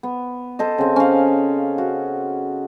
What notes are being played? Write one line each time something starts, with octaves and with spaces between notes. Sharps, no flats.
B3
A4 C5 D#5
C#3 C4
C#4 F5
F#4